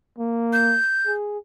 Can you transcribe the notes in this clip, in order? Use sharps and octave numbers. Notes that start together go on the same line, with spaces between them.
A#3
G6
G#4